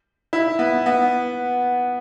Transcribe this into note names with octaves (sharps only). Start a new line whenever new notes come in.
E4
B3
B3